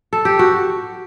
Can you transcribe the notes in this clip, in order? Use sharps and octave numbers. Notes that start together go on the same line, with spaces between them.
A4
G4
F#4